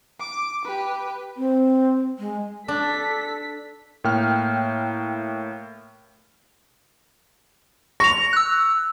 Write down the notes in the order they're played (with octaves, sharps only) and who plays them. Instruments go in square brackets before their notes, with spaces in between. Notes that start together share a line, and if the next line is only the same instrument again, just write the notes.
[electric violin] D6
G4 B4
[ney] C4
G#3
[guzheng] D4 [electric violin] A4 B6
[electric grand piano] A2 A#3 G5 F6
[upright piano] C#6 [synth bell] A#6 F7
[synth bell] E6 F#6